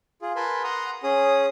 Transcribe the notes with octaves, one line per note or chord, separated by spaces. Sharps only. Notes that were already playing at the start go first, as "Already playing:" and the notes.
F4 G#4
A#4 B4 G#5 A5 B5 C6
F#5 A#5 C6 D#6
C#4 G#4 D#6